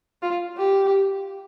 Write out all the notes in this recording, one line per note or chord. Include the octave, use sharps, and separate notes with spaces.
F4
G4